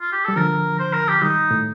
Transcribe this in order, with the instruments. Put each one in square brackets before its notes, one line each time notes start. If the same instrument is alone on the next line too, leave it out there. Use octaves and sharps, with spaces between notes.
[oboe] F4
G4
[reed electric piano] G3 [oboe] A4
[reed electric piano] D3 F3 [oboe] A#4
[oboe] C5
A#4
G4
[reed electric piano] D#3 G3 [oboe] D#4
[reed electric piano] A2